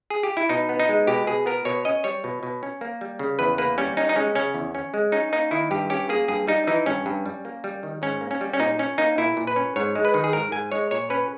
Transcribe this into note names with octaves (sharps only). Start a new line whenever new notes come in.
G#4
G4
E4
B2 D#4
B3
D#4
G#3
B2 G4
B2 G#4
B3 A#4
B2 C#5
C#4 D#5
G3 C#5
B2
B2
C#4
A#3
G3
C#3
E2 B4
A#3 B4
G3 C#4
C#4 D#4
D#4
G#3 C#4
C#3 C#4
E2
C#4
G#3
C#4 D#4
A#3 D#4
D#3 E4
G2 G4
C#4 G4
A#3 G#4
G2 G#4
G3 D#4
E3 D#4
G2 C#4
G2
G3
A#3
G3
D#3
G#2 C#4
A#3
C#4
G3
C#4
A#2 D#4
C#4
A#3 D#4
A#2 E4
A#2
B4
C#4
G#2 C#5
G#3
B4
D#3
G#4
G#2 A#4
G#2 G#5
G#3 C#5
A#2 C#5
C#4 B4